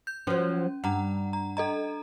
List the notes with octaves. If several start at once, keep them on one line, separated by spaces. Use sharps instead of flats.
G6
F3 F#3 C#4
G2 F#5 A#5
A#5
A4 D#5 A#5